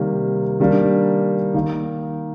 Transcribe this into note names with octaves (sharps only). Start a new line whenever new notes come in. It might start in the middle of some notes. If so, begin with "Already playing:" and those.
Already playing: C3 D#3 G3 A#3
D#3 G3 A#3 D4
D#3 A#3 D#4